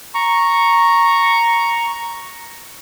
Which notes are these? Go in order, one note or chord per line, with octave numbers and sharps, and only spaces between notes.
A#5 C#6